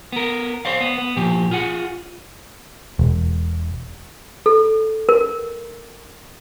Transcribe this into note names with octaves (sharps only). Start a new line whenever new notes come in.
B3 A#4
C5 D5 F5
B3
B3
A#2 F3 G4
F4 G#4 F#5
E1
A4
A#4